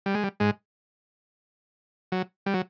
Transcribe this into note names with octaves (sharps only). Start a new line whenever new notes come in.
G3
G#3
G3
G#2 G#3
F#3
G3
F#3